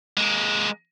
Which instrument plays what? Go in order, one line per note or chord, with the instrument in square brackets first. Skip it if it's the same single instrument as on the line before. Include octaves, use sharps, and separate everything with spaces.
[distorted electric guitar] G#3 A#3